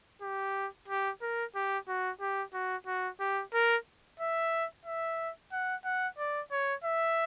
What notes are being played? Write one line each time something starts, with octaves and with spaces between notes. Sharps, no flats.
G4
G4
A#4
G4
F#4
G4
F#4
F#4
G4
A#4
E5
E5
F#5
F#5
D5
C#5
E5